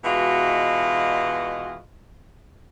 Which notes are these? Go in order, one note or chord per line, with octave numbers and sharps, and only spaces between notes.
B2 E3 G#3 F4 F#4